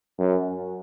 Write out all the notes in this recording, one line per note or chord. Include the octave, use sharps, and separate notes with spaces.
F#2